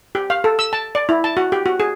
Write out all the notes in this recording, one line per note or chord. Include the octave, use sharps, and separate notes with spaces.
G4
F5
A4
E6
A5
D5
E4
A5
F#4
G4
F#4
G#4